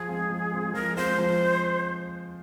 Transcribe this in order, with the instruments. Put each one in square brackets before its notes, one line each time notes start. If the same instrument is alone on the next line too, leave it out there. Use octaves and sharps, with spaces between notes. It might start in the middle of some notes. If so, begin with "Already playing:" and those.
Already playing: [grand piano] F3 [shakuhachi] G#4
[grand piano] G#3 C4 F4
F3
G#3 C4 F4
[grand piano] F3 [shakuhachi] A#4
[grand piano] G#3 C4 F4 [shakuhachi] C5
[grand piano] F3